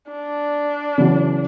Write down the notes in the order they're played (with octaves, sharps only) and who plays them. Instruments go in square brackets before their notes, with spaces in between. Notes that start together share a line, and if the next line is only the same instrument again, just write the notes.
[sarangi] D4
[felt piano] C#3 E3 F#3